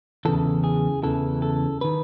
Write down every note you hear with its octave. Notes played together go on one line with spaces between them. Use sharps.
E2 C#3 E3 A4
G#4
E2 C#3 E3 A4
A4
D#3 B4